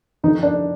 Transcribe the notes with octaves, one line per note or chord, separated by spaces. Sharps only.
F2 D3 F3 D#4
D4